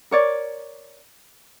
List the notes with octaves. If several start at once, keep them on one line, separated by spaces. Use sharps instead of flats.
A#4 C#5 D5